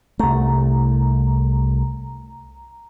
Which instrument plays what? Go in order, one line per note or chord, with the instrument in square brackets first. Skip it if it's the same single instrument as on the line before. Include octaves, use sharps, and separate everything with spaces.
[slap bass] C2 A3 [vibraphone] A#5